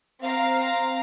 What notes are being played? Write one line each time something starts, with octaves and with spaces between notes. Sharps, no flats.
C4 F5 A#5